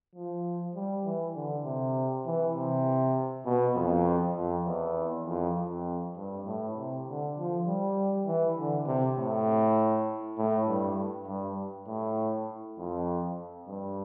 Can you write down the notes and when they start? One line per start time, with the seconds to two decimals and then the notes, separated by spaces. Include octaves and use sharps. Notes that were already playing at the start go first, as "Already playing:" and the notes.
0.15 F3
0.75 G3
1.04 E3
1.35 D3
1.65 C3
2.26 E3
2.55 C3
3.45 B2
3.75 F2
4.36 F2
4.65 E2
5.26 F2
5.55 F2
6.16 G2
6.46 A2
6.76 C3
7.07 D3
7.37 F3
7.67 G3
8.26 E3
8.57 D3
8.86 C3
9.17 A2
10.38 A2
10.67 G2
11.27 G2
11.87 A2
12.78 F2
13.67 G2